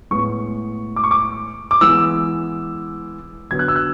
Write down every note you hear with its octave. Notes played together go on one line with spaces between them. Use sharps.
A2 G#3 B3 C#6
D6
C#6
D6
D6
E3 G#3 B3 E6
D3 F#3 B3 G#6
F#6
E6
F#6